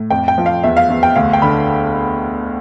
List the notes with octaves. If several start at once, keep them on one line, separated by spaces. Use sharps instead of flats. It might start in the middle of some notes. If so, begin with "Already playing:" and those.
Already playing: A2
F2 G5
G5
F3
F5
E2 E5
F5
E2
G5
D2 F5
G5
D3 B5